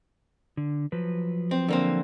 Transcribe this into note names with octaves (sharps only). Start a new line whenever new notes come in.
D3
F3 F#3 B4
C4
D3 A#3 C4